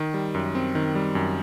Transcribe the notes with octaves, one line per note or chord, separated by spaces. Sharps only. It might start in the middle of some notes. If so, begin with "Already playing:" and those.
Already playing: D#3
G3
F#2
C4
D#3
G3
F#2